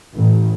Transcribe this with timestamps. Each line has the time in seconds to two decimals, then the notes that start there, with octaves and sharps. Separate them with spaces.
0.14 A1